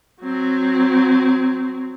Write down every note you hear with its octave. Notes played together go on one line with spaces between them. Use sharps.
F#3 C4